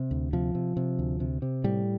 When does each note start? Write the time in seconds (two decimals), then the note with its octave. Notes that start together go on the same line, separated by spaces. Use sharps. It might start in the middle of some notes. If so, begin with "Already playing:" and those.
Already playing: C3
0.11 D2
0.33 C3 F3
0.55 C3
0.77 C3
0.99 D2
1.20 C3
1.42 C3
1.64 A2 G3